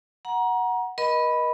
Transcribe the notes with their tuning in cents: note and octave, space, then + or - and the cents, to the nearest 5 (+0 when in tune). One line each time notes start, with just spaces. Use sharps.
F#5 +0 A#5 +25
A#4 +45 D#5 +0 B5 +0